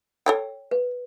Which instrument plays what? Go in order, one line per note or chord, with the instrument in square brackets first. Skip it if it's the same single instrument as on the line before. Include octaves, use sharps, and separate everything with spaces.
[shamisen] A4 C#5 G5
[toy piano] B4